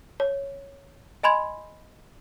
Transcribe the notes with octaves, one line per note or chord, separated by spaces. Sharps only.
C#5
D#5 G#5 B5 C6 G#6